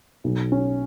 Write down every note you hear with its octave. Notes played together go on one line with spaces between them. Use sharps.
B1
C#4